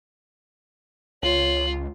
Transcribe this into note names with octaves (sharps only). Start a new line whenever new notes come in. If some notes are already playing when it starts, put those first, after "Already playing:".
C#2 F4 C#5 F#7